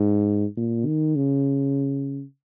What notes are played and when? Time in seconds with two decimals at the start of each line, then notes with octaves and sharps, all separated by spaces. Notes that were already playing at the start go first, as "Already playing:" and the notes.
Already playing: G#2
0.57 A#2
0.86 D#3
1.16 C#3